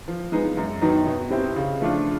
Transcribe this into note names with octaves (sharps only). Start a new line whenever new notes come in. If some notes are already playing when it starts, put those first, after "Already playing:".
F3
G#3 B3 D#4
F#2
D#3 F#3 B3 D#4
B2
G3 C4 E4
C#3
F3 A3 D4 F4